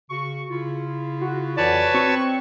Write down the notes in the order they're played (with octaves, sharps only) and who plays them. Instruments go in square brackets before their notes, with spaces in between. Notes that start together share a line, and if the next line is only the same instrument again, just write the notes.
[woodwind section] C#3 F#4 C#6
C#3 E4 F4
[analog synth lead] F#4
[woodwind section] F2 E3 D5 [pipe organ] B4 C#5 A5
[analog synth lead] C4 [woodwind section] C#6